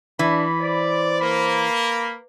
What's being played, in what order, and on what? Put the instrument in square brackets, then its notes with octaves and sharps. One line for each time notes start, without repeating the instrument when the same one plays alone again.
[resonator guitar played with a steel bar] E3 [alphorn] D4 [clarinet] B5
[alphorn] C5 [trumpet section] D5
[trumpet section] A#3 [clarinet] B5